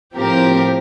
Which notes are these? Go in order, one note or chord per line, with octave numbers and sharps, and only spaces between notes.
A2 F3 C4 G4 A#4